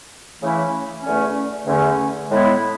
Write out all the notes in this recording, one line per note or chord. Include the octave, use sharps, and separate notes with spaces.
C#3 E3 A3 C#4 E4
E2 D3 A3 C#4
E2 D3 A3 C#4
A2 G#3 B3 E4